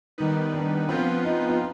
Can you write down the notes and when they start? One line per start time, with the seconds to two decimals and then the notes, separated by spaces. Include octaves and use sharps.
0.18 D#3 G3 B3 D#4 B4
0.54 D4
0.88 F3 B3 C4 F4 B4
1.25 D#4
1.48 D#4